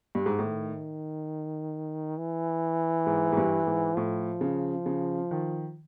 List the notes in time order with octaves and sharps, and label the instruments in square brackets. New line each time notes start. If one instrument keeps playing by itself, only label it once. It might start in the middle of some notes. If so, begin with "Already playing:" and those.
[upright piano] G2
G#2
[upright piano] A2 [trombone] D#3
[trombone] E3
[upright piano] G#2
G#2
G2
G#2
[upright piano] A2 [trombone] F3
[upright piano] C#3
C#3
D#3